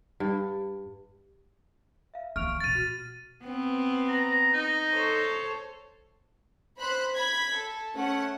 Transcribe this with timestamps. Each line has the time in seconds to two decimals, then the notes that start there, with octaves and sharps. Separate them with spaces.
0.20 G2
2.14 E5 F5
2.36 D#3 A#3 C#6 F6 D7 F7
2.60 B2 E3 A6 D#7
2.75 F#4
3.44 B3 C4
4.09 A#5
4.53 D#4
4.93 A4 C5 C#5
6.78 C5 B5 F#6
7.14 B5 G#6 B6
7.55 A4
7.96 A3 C#4 F#5